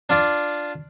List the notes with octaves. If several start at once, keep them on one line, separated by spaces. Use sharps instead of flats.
D4 F4 D5